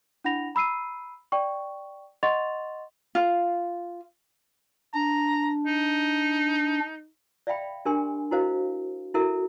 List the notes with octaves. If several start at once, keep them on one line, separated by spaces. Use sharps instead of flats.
D4 E4 F#5 B5 A#6 F7
A#5 B5 E6 C7 D#7
D5 G5 C#6
D#5 F#5 C6 C#6 A6 F7
F4
D4 A#5
D#4
D5 E5 F5 G5 B5
D4 G4 A#4 G#5 C6
E4 F#4 A#4 C5 D#5 F5
E4 F#4 A4 A#4 E5